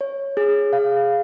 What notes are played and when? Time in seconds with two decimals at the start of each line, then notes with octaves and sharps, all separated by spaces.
0.01 C#5
0.37 G#4
0.73 F5